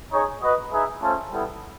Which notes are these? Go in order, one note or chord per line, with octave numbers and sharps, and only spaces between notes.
D#4 G#4 C#5
F#4 B4 D#5
D#4 G#4 B4 E5
A3 C#4 F4 A4 C5
G3 B3 E4 A4